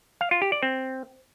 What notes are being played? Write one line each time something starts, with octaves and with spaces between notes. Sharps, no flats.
F5
F4
G4
D5
C4